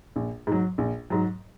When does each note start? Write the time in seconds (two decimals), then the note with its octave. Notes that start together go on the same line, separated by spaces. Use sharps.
0.16 A#1
0.47 G#2 F#3
0.78 A#1
1.10 G#2 F#3